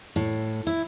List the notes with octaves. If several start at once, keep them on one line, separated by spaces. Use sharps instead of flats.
A2
E4